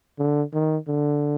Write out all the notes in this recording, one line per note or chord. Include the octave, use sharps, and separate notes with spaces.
D3
D#3
D3